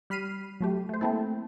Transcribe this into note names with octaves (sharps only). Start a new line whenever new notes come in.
G3 B5 F6 C7 D#7
F#3 A3 G4
A3 C5
A3 A#3 C4 E4 A4